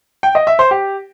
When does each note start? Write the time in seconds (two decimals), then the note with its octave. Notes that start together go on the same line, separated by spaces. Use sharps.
0.23 G5
0.35 D#5
0.47 E5
0.59 C5
0.71 G4